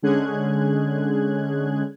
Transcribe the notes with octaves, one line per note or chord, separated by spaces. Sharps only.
D3 G#3 C#4 G#4 F#6 G#6